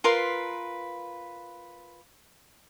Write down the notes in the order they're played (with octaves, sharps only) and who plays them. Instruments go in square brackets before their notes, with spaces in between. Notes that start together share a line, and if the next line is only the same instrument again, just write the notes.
[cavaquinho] F4 A#4 B4 C6